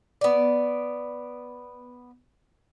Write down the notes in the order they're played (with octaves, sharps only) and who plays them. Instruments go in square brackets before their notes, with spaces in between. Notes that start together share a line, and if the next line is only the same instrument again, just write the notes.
[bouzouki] B3 D5